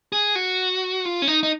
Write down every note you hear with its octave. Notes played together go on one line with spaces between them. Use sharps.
G#4
F#4
F4
C#4
D#4
D#4